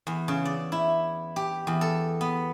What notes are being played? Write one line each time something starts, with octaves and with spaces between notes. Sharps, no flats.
E2
C#3
D5
E4
G4
E2
A4
B3